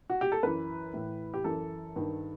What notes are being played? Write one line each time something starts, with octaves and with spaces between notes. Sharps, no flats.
F#4
G4
A4
F#2 E3 B4
A2 E3
G4
F#2 E3 A4
G2 D#3